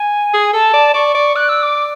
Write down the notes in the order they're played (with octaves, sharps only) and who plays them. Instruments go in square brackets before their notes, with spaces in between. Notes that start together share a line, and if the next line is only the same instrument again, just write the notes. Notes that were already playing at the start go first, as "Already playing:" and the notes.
Already playing: [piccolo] G#5
[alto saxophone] G#4
[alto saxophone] A4 [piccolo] A5
[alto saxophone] D5
[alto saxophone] D5 [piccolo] C#6
[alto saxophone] D5
[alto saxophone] D5 [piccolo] F#6
[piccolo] E6
D6